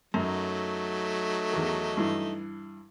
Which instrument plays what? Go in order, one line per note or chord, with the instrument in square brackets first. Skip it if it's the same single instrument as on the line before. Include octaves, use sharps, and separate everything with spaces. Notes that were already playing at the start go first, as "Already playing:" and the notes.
[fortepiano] F#2 [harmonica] F#3 A3 D#4
[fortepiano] E2 D#3
G2 E3